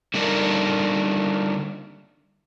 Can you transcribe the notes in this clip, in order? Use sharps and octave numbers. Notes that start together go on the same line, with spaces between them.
D3 G3 A#3 D4 D#4 A#4